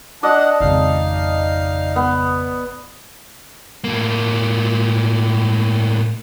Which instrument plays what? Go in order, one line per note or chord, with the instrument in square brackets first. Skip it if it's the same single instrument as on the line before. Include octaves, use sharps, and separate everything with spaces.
[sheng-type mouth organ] D4 F#5 [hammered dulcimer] D5 D#5 A5
[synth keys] G#1 F2 C#3 [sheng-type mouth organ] D#4 F5
[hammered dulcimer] B3
[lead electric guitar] A2 A#3